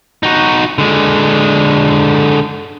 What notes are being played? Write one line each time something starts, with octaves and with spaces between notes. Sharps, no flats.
D#4 F#4
D3 G#3